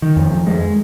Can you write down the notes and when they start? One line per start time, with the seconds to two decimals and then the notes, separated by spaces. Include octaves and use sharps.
0.02 D#3
0.17 F2
0.31 F2
0.47 G#3